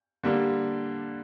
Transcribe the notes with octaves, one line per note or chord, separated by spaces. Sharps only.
D3 G3 A#3 D4